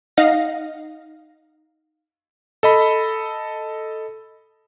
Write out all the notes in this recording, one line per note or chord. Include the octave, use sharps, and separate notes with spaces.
D#4 D#5 F5 F#5 A#6
A4 D#5 B5